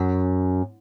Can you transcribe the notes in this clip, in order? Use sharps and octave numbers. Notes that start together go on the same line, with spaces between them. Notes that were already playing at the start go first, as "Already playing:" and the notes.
Already playing: F#2